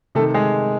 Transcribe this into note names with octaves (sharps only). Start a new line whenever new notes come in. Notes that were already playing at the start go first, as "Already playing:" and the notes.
C3 D#3 A3 A4
G#3 G#4